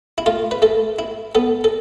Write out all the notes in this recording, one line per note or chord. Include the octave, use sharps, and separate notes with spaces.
E4
A3 F4
B4
A3 A4
E4
B3 A4
A4